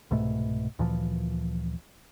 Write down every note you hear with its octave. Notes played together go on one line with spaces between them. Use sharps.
C2 G#2 B2 A3
D2 A#2 E3 F3